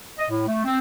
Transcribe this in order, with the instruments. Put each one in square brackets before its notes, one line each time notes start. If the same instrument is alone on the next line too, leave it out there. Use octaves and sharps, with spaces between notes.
[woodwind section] D#5
A2
A3
C4